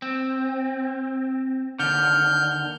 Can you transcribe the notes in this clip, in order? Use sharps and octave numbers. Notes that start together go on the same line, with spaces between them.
C4
D#2 D3 F6 G6